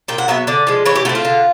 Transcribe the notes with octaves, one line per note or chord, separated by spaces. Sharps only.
A#2 G5
F#5
F#3 B3 E5
D3 D5
F3 G#3
E3 C#5
G4
A3 C4 F#4
F4
D3